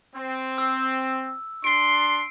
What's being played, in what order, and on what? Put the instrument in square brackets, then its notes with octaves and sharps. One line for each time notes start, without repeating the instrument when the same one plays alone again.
[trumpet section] C4
[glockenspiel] E6
[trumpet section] D4 C6 [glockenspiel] C7 D7